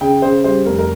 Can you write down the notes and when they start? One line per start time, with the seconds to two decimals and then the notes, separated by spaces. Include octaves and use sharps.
0.01 C#3 G5
0.22 C#3 C5
0.44 G3 C5
0.66 F1 A#4
0.79 A#4